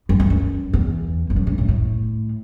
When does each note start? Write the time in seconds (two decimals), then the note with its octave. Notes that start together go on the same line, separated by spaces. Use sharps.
0.09 F#2
0.20 E2
0.30 F#2
0.73 E2
1.30 E2
1.36 F#2
1.47 G2
1.58 A2
1.68 A2